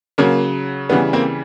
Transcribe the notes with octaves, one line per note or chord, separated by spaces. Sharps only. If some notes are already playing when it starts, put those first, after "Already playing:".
C#3 F#3 A#3
C#3 E3 G3 B3
A#3 C4